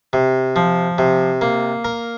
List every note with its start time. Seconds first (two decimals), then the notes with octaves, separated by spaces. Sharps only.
0.13 C3
0.56 F3
0.98 C3
1.41 A#3
1.85 A#4